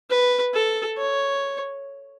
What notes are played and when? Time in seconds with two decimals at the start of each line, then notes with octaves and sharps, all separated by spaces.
0.10 B4
0.54 A4
0.98 C#5